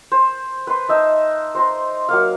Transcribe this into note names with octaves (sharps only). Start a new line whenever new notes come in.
C5
B4 C6
D#4 E5 A5
C5 A#5 C6
F#3 A#3 F5